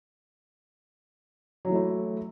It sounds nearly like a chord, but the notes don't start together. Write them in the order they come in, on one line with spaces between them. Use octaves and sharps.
F#3 E3 A3 E4